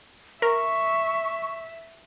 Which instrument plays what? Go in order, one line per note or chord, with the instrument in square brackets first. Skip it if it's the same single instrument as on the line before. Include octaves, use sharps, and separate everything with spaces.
[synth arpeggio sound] A#4 [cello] E5 [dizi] C#6